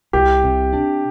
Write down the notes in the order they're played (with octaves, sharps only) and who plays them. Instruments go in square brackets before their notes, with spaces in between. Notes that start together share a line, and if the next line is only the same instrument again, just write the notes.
[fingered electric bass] C2 [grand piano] G4
[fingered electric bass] C3
D4